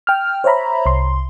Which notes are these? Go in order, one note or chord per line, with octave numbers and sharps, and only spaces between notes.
G5 F6
C5 C#5 E5 A#5 B5
C2 C6